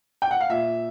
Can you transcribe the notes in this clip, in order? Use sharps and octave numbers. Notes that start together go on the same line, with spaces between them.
G5
F#5
F5
A#2 E5